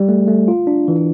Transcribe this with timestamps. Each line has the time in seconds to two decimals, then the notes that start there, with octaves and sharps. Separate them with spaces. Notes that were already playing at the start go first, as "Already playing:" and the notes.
Already playing: G3
0.09 A3
0.28 A3
0.48 F4
0.67 D4
0.88 E3